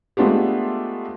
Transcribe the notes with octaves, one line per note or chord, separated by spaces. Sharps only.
G#3 A3 B3 D4 F4 G4